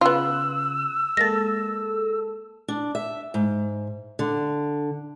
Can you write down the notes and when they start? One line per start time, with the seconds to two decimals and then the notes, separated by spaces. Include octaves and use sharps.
0.01 C#3 B3 F4 E6 F#6
1.17 G#3 A#3 A4 A6 A#6
2.68 D4
2.95 E5
3.34 G#2
4.19 D3